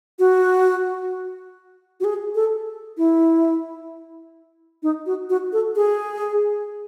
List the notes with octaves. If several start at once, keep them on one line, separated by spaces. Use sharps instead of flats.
F#4
F#4
G#4
A4
E4
D#4
F#4
F#4
A4
G#4